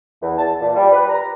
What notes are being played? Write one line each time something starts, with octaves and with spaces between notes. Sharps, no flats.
E2
A5
A#2
G3
B4
A#5